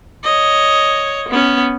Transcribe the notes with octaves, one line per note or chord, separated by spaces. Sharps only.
C#5 D#5
B3 C#4